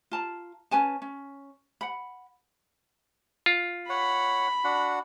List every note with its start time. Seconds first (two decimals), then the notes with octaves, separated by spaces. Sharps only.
0.11 F4 A5 A#5
0.71 C#4 B4 G#5 A5
1.02 C#4
1.81 F#5 B5
3.46 F4
3.90 C#5 F#5 B5
4.64 D4 F#4 F#5